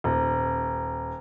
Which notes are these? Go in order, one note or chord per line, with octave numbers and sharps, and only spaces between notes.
D#1